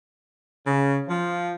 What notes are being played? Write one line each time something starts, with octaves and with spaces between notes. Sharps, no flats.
C#3
F3